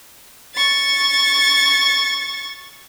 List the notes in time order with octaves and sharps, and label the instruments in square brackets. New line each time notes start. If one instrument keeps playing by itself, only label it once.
[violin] C#6 A6